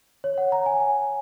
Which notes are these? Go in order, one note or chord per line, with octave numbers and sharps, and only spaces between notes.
C#5
F#5
A#5
G#5
G#5